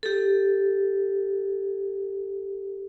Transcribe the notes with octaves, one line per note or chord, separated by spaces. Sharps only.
G4 A4